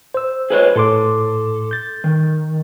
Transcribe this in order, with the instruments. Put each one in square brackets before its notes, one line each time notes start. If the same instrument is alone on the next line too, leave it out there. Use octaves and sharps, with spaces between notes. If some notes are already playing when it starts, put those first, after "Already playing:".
[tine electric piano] C5 E6
[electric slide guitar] G#4 B4 C#5
[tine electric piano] A2 C6 D6 [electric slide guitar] A4
[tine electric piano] G6 A6
[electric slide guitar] D#3